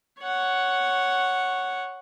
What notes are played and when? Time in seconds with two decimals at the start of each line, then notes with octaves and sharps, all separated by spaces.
0.21 C#5 F#5